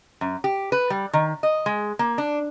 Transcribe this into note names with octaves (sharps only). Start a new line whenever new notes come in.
F#2
G4
B4
G3
D#3
D#5
G#3
A#3
D4